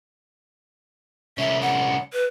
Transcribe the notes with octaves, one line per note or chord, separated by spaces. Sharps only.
C2 C#4 E5
F#5
B4